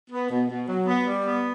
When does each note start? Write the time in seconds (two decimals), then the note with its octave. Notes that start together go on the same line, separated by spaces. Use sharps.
0.11 B3
0.30 B2
0.49 B2
0.68 F#3
0.87 B3
1.06 G3
1.25 B3